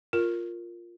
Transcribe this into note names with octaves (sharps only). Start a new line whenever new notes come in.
F4 A#4